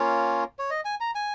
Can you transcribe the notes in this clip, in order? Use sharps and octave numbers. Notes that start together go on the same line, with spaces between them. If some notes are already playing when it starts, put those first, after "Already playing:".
Already playing: A#3 C#4 F4 C#5
C#5
D#5
G#5
A#5
G#5